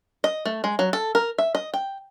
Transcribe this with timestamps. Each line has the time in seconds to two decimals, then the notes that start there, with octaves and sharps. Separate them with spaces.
0.24 D#5
0.46 A3
0.64 G#3
0.79 F#3
0.93 A4
1.15 A#4
1.38 E5
1.55 D#5
1.74 G5